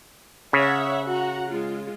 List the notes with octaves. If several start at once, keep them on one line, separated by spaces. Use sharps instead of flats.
C#3 C#5 E5 F#5
F#4 F#5 A#5
G#3 F4